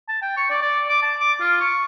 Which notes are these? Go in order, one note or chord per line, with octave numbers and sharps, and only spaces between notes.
A5
G5
C#6
D5
D5
D6
A5
D6
F4
C#6